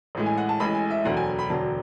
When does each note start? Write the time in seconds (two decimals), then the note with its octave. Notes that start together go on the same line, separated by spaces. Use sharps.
0.15 A1 A2 G#3
0.26 G#5
0.37 F#5
0.49 A5
0.60 A1 A2 G#3 B5
0.74 G#5
0.91 E5
1.05 E1 D2 D3 F#3 F#5
1.17 G#5
1.39 B5
1.50 E1 D2 D3 F#3 A5